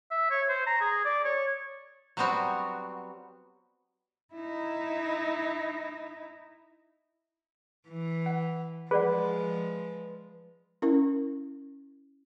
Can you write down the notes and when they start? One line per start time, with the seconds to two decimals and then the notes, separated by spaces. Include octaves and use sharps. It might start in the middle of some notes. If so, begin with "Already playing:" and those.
0.11 E5
0.31 C#5
0.49 C5
0.67 A#5
0.81 G#4
1.05 D5
1.25 C#5
2.17 F#3 G3 B3 C4 F#4
4.34 D#4 E4
7.88 E3
8.26 F#5
8.91 F3 G#3 G#4 B4 D5 F#5
10.82 C#4 E4 A#4